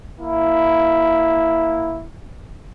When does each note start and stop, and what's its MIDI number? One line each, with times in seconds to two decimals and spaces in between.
0.20 2.03 58
0.20 2.03 64